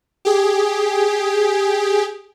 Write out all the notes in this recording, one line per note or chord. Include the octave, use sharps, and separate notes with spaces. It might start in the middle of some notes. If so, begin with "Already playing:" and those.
G4 G#4